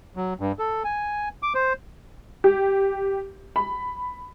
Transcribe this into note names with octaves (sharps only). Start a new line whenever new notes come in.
F#3
G2
A4
G#5
D6
C5
G4
B5